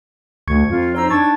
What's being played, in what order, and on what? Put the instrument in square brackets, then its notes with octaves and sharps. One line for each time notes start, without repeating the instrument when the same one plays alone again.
[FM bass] D2 [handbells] C#6 G#6 C#7
[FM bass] F2 [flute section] F4
[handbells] D#4 C#5 [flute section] C5 A#5 E6
[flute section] D4 C#6 G#6 [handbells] A5 A6